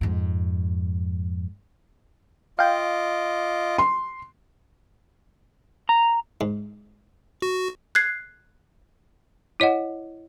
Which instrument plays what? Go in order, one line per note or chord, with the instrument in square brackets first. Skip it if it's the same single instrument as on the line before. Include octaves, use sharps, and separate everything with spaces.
[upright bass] F2 G#2
[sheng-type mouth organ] F4 D#5 D6 [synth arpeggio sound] F5 G5
[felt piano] C6
[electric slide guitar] A#5
[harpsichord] G#2
[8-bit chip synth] F#4
[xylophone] F#6 G#6 C7
[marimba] E4 C#5 D#5 F#5